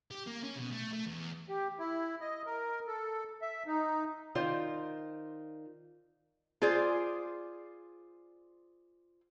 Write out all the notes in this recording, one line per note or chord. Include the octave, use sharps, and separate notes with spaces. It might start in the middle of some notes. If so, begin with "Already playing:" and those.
G4
A#3
C#4
B2
A3
A3
E2
G4
E4
D#5
A#4
A4
E5
D#4
D#3 F4 C5 D5
F4 G#4 C5 D5